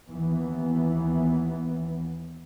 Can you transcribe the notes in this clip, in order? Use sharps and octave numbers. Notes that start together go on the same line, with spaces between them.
D#2 E3 B3